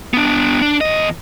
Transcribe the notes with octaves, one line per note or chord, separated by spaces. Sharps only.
B3 D4
D4
E2 D#5